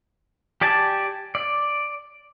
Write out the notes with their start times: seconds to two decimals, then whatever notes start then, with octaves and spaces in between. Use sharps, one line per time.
0.61 G4 D5 G#5 A5
1.35 D5